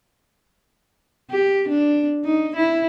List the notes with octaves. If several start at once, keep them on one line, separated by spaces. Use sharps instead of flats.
G4
D4
D#4
E4